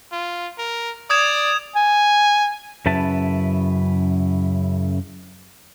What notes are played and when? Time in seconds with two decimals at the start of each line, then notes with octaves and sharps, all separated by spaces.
0.12 F4
0.59 A#4
1.10 D5 D#6 G#6 E7
1.75 G#5
2.86 F#2 C#3 E4 B4 A5